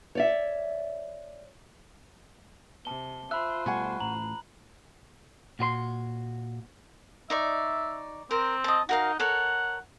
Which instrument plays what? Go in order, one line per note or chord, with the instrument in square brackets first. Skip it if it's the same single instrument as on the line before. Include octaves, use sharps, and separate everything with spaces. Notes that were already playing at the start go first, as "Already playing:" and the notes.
[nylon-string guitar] C#5 D5 E5
[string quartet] C3 [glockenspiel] A5 G7
[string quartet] F4 C5 [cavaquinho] E5 [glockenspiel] B5 F#6
[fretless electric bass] B2 G3 A3 [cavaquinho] F#5 G#5 C#6
[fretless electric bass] A1 A2 [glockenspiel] A#5 F#7
[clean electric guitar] A#2 F#4 B4 C6
[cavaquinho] D#4 D5 C#6 [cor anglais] E5
[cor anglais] C4 [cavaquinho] A#4 C5
[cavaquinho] D#5 A5
[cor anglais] D#4 [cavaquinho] F#4 A#4 F5
[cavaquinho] A4 A#4 C#5 [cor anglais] F#5